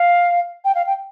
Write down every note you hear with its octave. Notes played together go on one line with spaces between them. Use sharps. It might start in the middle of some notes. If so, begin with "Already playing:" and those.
Already playing: F5
G5
F5
G5